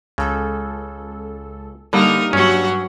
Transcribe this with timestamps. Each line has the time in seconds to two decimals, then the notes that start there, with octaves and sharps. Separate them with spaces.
0.18 C#2 C#3 A4
1.93 D3 G3 A#3 D#4 A#4
2.33 G2 F#3 C#4 F#4 E6